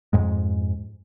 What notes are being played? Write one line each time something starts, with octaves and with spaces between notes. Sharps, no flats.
F2 G#2 G#3